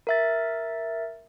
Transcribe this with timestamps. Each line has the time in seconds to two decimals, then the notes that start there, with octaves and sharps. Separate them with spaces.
0.07 A#4 E5 A6